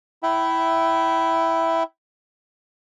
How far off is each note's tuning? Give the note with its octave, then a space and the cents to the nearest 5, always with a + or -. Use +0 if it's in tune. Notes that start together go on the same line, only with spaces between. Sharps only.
E4 +0 E5 +0 G5 -30